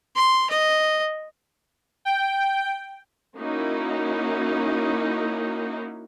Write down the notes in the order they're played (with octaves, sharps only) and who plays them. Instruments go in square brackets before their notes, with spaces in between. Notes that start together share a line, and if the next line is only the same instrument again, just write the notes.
[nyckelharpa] C6
D#5
[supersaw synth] G5
[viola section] A#3 C#4 D#4 E4 F#4